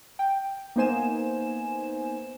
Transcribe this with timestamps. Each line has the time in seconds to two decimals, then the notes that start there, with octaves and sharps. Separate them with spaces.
0.19 G5
0.76 A#3 B3 D#4 C5 G#5 E7